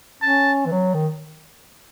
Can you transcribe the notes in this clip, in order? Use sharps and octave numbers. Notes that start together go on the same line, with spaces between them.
C#4 A5
E3
F#3
D#3